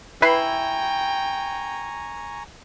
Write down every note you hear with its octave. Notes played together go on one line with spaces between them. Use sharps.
E4 B4 G5 G#5 A#5 B5 C#6 C7